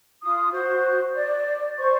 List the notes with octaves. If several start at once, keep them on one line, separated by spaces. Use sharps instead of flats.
F4 D#6
F#4 C5
D5
C5 D5 C#6